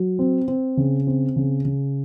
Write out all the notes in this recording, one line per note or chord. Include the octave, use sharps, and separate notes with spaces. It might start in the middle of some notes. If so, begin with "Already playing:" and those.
Already playing: F#3
C4
C4
C#3
C4
C#3
C#3